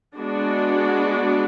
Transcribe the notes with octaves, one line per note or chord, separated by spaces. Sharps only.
G#3 B3 D4 F#4